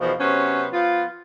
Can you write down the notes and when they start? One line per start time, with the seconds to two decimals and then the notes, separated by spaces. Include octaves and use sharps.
0.01 E2 B2 D#3 F3
0.19 C3 F#3 B3 C#4 C5
0.73 F3 B3 F4